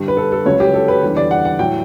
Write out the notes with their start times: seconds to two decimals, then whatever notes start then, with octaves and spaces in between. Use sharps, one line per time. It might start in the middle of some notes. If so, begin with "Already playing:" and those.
Already playing: G2 D3 G3
0.08 B4
0.17 A4
0.32 A4
0.45 C#2 C#3 F#3 C#5
0.60 G4
0.74 A4
0.88 B4
1.03 E2 D3 G3
1.17 D5
1.31 F#5
1.45 F#5
1.59 A2 F#3 G5